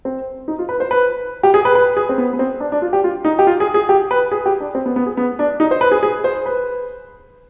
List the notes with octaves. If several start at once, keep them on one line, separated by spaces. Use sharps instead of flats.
C4
D#4
F4
B4
C5
B4
G4
G#4
B4
B4
G#4
C4
B3
B3
C4
D4
D4
F4
G4
F4
D#4
G4
F4
G#4
G#4
G4
B4
G#4
G4
D4
C4
B3
B3
G#4
B3
D4
D#4
C5
B4
G#4
G#4
C5
B4